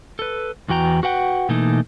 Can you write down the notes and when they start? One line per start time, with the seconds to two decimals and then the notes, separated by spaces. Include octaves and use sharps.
0.19 A4 B4
0.68 E2 E3 F#4 G5 A#5
1.03 F#4 B4 F#5 G5
1.49 B2 E3 A3 A#3 D#4